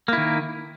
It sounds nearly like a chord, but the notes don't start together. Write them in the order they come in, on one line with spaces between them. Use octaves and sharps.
A#3 E4 D#3